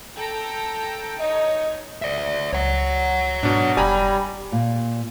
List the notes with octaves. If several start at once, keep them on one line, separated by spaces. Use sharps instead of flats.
A4 G5 A#5
D#4 C#5 D#5
D5 E5
C#2 C#5 F#5
G#2 B2 D4
F1 G3 G#5 A#5 B5
A#2